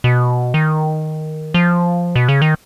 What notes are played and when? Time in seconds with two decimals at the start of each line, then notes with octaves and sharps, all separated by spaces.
0.04 B2
0.54 D#3
1.54 F3
2.16 B2
2.29 C#3
2.42 D#3